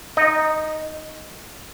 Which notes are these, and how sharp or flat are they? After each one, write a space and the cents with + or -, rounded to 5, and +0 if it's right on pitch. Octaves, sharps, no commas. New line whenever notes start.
D#4 +0 D#5 -25